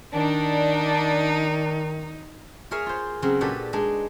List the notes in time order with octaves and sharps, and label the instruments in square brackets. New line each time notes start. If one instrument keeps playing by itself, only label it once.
[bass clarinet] D#3 [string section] D4 [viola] D#4
[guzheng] G#4 A#4 C#5 E5 F5 G#5
F4 C5
C#3 F#3 C4
A#2 D4 F#4 G4 A4 B4
G#3 D4 D#4